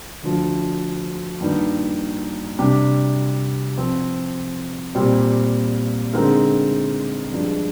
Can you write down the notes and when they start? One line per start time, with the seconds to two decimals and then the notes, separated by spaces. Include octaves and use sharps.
0.23 D2 D3 F3
1.41 G2 D#3 A#3 D#4
2.59 C3 G3 D4 G4
3.77 F3 C4 F4
4.95 A#2 G3 C4 G4 C5
6.13 D3 G#3 C4 D#4 A#4
7.31 G2 F3 G#3 D4 G4